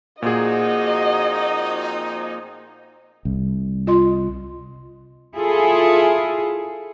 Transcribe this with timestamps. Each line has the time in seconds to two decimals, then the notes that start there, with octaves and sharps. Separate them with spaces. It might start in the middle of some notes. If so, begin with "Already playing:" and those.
0.22 A#2 F3 C4 D#4 F#4 G#4 D#5
3.25 C2
3.87 F4 D#5 C6
5.34 E4 F4 G#4 A4